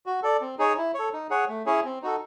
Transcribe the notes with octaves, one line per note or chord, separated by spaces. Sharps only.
F#4
A4 D5
C4
D#4 G#4 C#5
E4
A4 C#5
D#4
G#4 C#5 F#5
A3
C#4 E4 G#4 C#5
C4
D#4 F#4 A4